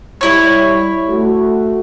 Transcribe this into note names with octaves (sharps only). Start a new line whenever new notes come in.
G3 E4 C#5
A3 F#4